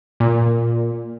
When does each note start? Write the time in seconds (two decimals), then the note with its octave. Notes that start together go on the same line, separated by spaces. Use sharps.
0.20 A#2